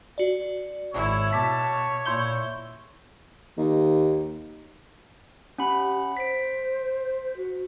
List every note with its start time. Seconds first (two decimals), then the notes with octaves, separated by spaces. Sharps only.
0.18 F#4 D5
0.94 G#1 E4 C#5
1.33 B2 A5 D6 B6
2.06 A#2 E4 C6 G6 G7
3.58 D#2
5.58 C#4 G4 F#5 B5
6.17 C5 B6 D7
7.36 F#4